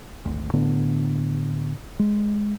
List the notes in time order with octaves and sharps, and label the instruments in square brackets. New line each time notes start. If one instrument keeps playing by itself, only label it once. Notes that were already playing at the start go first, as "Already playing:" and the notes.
[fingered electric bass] G#1 D2
A2 D3 B3 D4
G#3